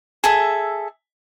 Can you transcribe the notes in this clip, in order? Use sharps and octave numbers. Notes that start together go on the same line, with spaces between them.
G#4 A4 E5